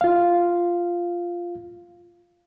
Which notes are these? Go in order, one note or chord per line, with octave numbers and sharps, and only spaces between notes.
F4 F5